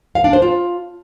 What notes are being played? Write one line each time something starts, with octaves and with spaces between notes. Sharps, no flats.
F5
D4
C5
F4